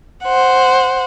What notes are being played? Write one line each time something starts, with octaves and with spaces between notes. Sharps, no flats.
C5 F#5